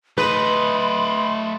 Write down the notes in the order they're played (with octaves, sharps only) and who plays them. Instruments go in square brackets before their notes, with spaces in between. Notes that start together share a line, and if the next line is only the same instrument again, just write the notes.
[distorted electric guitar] A3 D#5 [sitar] B4 [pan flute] B5 [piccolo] C6